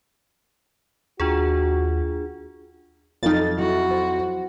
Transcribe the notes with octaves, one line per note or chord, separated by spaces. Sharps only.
D#2 D4 F4 F#4 G#4
F2 F#3 D#4 A4 F5 F6 A6
F#3 E4 F#4
C5